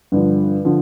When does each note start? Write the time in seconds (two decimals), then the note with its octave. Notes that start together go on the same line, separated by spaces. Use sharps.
0.12 G2 D3 F3
0.65 D3 F3